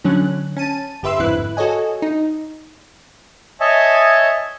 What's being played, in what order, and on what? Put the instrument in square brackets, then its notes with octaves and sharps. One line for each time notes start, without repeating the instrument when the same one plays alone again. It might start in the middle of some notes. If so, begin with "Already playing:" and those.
[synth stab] D3 F#3 C#4 F#6
C#4 A5 D#7
G1 G4 B4 E5 C6 E6
G1 F2 G#2 E4 B4 F#6
F#4 A4 C#5 D#5 G#5
D#4
[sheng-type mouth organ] C#5 D#5 E5 G#5 A5 C#6